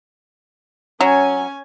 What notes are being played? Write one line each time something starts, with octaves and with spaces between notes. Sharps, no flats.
F#3 C#4 G#5